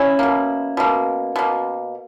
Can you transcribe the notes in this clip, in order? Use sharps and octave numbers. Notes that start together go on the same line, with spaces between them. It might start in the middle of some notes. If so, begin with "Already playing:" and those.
Already playing: C#4 E4
B2 A#3
B2 A#3
B2 A#3